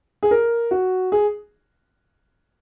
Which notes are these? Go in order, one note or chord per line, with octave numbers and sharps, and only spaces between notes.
G#4
A#4
F#4
G#4